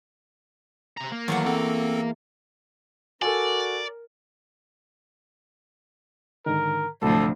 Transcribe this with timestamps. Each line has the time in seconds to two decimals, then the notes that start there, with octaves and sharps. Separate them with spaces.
0.97 C3 A#5
1.12 A#3
1.28 E2 D#3 F#3 A3 F#5
1.46 C4 A4
3.22 F#4 A4 A#4 D5 G#5
6.46 G#2 D3 D#3 A#4
7.02 D2 A2 C3 F3 F#3 A4